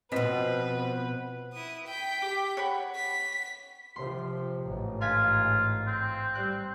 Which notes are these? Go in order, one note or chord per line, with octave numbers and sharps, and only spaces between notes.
B2 F3 C4 B4 D#5 B6
E4 D#6
G5 B6
G4
C#5 F#5 B5
B6
C3 F3 C6
A1 G#2
F4 F5 G#5 B6
C4
G3 F#6